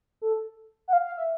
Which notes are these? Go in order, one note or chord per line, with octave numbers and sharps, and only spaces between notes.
A4
F#5
F5
F5
E5